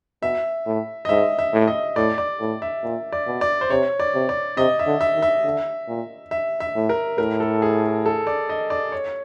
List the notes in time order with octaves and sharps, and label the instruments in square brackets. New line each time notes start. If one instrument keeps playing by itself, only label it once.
[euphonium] B2 [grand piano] E5
[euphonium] A2
[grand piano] D#5
[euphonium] G#2 [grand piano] E5
[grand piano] E5
[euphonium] A2
[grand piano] D#5
[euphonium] A2 [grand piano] D5
[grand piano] D5
[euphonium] A2
[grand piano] E5
[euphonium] A#2
[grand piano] D5
[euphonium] B2
[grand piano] D5
C5
[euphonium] C3 [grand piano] C#5
[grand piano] D5
[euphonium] C3
[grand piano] D5
[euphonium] C3 [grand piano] D#5
[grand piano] E5
[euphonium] D3
[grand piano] E5
[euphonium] D#3
[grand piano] E5
[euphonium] D3
A#2
[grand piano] E5
E5
[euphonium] A2
[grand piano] A#4
[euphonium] A2 [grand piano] A#4
[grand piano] A4
G#4
A4
D5
D#5
D5
C#5